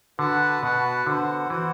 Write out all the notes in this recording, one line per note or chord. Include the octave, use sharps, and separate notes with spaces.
D3 F#4 B4 F#5 A5
B2 F#4 B4 F#5 A5
D3 B3 F#4 C5 F#5
E3 B3 F#4 C5 F#5